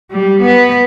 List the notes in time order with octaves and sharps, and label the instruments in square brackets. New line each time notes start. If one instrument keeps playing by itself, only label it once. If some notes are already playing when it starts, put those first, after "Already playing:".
[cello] G3
B3